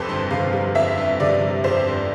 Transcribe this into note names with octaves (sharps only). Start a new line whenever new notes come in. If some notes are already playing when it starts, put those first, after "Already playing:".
Already playing: F2 C3 A4 B4 C5
G1
C3 F5
G3
F2 E5
G1
C3 D5
G3
F2 C5
G1